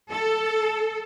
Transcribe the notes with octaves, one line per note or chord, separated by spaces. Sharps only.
A4